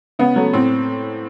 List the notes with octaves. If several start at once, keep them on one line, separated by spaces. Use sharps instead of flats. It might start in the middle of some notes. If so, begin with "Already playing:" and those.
C#3 B3
F#3 A3
A2 C4